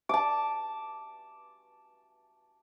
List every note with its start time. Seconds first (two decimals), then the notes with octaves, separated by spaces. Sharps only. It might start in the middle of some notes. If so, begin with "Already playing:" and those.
0.09 A5 D6